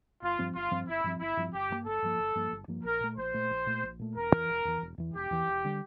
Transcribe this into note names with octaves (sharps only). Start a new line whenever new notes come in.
G1 F4
G2 F3 C4
G1 F4
G2 F3 C4
G1 E4
G2 F3 C4
G1 E4
G2 F3 C4
G1 G4
G2 F3 A#3
G1 A4
G2 F3 A#3
G1
G2 F3 A#3
G1
G2 F3 A#3
A#1 A#4
A#2 A3
A#1 C5
A#2 A3
A#1
A#2 A3
A#1
A#2 A3
E1 A#4
E2 E3
E1
E2 E3
E1
E2 E3
E1 G4
E2 E3
E1
D3 G3